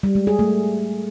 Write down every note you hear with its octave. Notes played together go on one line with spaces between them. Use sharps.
G3
G#3
G#4
A3